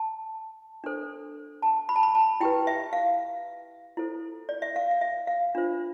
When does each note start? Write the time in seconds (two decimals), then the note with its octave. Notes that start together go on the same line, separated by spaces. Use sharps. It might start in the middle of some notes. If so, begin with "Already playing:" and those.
Already playing: A5
0.84 D4 A4 C5
1.62 A5
1.89 B5
1.96 A5
2.03 B5
2.15 A5
2.40 E4 G4 B4 G5
2.67 E5
2.93 F5
3.97 E4 A4 C5
4.49 D5
4.62 E5
4.76 F5
4.91 F5
5.01 E5
5.27 F5
5.55 D4 F4 C5